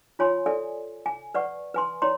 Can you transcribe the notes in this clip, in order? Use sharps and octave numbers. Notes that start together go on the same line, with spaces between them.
F4 C#5 G#5 C6
A4 D5 E5 G#5
G#5
B4 D5 F#5 C#6
B4 G#5 C6
C#5 D5 A#5 C6